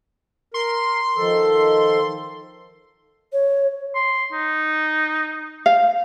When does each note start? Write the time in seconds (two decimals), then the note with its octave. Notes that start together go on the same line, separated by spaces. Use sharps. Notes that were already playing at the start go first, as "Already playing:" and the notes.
0.54 A#4 C6
1.17 D#3 F3 A4
3.32 C#5
3.95 C6
4.33 D#4
5.66 F5